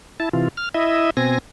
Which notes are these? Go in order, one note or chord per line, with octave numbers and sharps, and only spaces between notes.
E4 A5
C3 E3 F4
F6
E4 D#5 E5
B2 C4 G#5 A#6